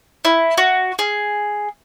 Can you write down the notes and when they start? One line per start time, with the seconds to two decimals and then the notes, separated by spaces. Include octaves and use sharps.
0.25 E4
0.57 F#4
0.99 G#4